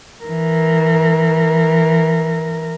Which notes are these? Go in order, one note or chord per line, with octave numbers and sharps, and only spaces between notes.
E3 A#4